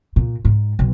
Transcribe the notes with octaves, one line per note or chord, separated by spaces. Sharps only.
A#2
G#2
B1